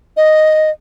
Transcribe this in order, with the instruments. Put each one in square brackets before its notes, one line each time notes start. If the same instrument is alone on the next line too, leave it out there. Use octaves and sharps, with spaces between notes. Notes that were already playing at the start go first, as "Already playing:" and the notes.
[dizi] D#5